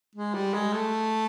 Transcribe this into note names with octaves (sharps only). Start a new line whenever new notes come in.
G#3
G3
G#3
A3